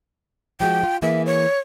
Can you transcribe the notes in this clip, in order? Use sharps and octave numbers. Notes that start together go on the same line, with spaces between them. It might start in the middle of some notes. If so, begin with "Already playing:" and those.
F3 G#3 F#4 G5
F4
E3 A#3 G#4 E5
C#5